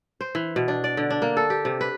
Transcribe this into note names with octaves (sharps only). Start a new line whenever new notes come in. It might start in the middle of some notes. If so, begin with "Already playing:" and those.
C5
E3
B2
D4
D5
D3
D4
A#3
A4
G4
C3
B4